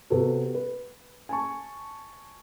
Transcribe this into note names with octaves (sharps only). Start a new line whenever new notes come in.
C3 B3 F#4 A4
B4
G#5 A5 C#6